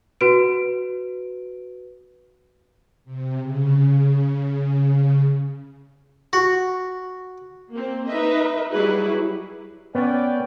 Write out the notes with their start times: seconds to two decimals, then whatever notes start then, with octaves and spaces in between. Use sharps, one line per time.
0.21 F#4 B4 D7
3.05 C3
3.41 C#3
6.33 F#4
7.71 A#3 C4
8.07 D#4 B4 D#5 E5
8.72 F#3 G3 E4 F#4 G#4 B4
9.95 B3 C#4 D5 G5